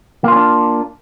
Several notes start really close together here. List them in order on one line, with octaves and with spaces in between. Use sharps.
A#3 F4 C#4 D4